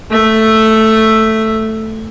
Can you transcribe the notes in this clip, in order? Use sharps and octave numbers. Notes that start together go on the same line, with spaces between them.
A3 E5